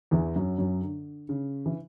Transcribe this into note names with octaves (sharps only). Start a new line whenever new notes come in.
E2 E3
F#2 F#3
F#2 F#3
D3
C#3
E3